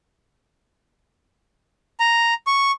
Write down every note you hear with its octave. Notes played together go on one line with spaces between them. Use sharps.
A#5
C#6